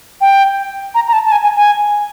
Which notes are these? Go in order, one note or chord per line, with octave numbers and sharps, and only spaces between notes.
G5
A#5
A#5
A5
A5
G#5
G#5
G#5